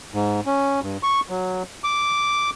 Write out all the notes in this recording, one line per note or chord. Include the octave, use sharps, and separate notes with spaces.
G#2
C#4
G2
C#6
F#3
D6